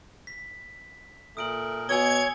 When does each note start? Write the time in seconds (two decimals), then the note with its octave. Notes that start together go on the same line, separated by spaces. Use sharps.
0.27 B6
1.37 A#2 A3 A#4 D#6 D7 F#7
1.89 B2 C#5 G#5 E6 G#6 G7